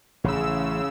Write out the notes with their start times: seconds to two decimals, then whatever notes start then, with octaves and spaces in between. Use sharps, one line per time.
0.24 A1 C#3 E6